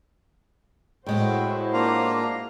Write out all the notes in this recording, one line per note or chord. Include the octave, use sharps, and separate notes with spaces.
A2 G#3 B3 E4 F#4 C5 G5
A#3 D4 F4 F5 A#5